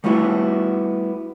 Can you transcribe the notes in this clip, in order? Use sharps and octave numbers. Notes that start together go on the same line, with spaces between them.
G3 A3 B3 E4 F#4